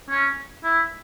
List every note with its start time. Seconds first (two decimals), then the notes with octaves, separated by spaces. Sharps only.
0.10 C#4
0.64 E4